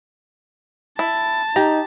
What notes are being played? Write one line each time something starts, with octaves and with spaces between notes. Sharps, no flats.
E4 A5
D#4 G4 A#5